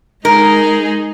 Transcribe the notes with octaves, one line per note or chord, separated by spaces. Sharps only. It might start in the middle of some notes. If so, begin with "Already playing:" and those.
G#3 D#4 G#4 A#4